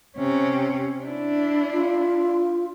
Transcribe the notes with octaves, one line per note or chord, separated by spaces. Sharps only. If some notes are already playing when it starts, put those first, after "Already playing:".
C3 C#4
D4 E4
F4